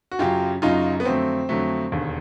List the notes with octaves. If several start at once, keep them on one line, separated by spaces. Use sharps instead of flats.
F#4
F#2 C#3 F#3 F4 G4
F#2 C#3 F#3 D#4 F4
B3
F2 D3 F#3 A3 C4
F2 D3 F#3 A3
E1 D#2 D3